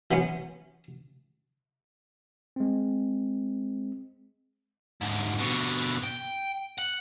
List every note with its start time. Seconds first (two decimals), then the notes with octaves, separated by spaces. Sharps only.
0.11 E3 F#3 B3 C#4
2.56 G#3 C4
5.01 D2 G#2
5.38 B2 D3
6.03 G5
6.78 F#5